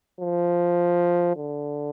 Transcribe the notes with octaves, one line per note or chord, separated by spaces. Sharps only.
F3
D3